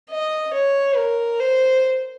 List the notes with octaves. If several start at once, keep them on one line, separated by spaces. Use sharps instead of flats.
D#5
C#5
A#4
C5